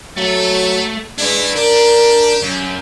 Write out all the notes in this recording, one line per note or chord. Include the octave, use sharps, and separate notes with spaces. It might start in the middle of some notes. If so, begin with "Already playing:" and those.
F#3 A3 A4
G#3 D4 E4 B4
D4 G4 A#4
F#2